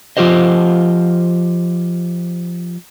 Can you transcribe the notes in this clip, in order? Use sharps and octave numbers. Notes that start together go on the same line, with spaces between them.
F3 F4 G4 C5 D#5